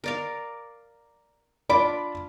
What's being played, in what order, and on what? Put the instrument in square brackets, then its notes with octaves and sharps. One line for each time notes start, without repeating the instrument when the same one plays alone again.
[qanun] A#4 D5 F5
[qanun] D4 F4 D6 [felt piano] D5 B5